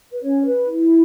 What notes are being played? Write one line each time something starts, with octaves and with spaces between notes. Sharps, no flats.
B4
C#4 C#5
B4
E4